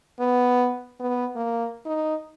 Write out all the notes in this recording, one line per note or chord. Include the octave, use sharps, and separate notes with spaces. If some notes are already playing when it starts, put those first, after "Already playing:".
B3
B3
A#3
D#4